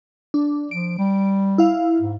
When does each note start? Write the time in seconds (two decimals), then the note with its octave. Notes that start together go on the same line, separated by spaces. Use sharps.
0.34 D4
0.71 F3 D7
0.98 G3
1.58 E4 F5
2.00 G#2